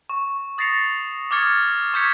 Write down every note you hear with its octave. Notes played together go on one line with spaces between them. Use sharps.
C#6
D#6 A6 A#6 C7 C#7 F7
D6 D#6 F6 G#6 A6 C#7
C#6 E6 G6 G#6 B6 C#7